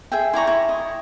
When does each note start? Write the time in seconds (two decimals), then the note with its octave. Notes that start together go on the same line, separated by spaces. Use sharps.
0.12 G#4 E5 G5
0.33 E4 D5 A#5 C#6
0.47 E4
0.69 D#5